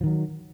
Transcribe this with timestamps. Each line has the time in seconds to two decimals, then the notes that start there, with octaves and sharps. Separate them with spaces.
0.01 F3
0.04 D#3
0.06 F#3